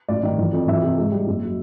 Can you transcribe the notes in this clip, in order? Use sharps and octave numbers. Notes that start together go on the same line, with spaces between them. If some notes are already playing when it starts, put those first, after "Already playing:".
A1 D5
D#3
E3
F2
E3 E5
C3
G#2
G3
F#1
F#3